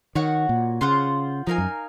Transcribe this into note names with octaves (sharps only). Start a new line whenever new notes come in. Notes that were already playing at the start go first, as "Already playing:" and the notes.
D#3 F#4 C#5 F#5
A#2
C#3 F4 C5 F#5
F3 D#4 A#4 F5 G#5
F#2